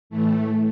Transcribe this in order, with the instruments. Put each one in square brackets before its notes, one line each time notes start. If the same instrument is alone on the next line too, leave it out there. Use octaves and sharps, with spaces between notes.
[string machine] A2 E3 A3